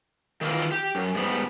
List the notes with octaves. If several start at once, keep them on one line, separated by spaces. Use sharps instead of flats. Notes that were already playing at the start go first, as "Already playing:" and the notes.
D#3 E3 F4 A#4
G4
F#2
G#2 G3 B3